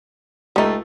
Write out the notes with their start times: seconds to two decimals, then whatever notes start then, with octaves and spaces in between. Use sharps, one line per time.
0.56 C#2 G3 A3 D#4